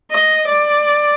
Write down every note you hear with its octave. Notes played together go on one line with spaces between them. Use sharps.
D#5
D5